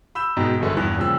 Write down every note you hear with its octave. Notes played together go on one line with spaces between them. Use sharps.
B5 E6 G6 E7
G#2 B2 D#3
G1 F#2 D3 B4
E2 G2 E3 F#6
A#2 C#3 F3 G3 E6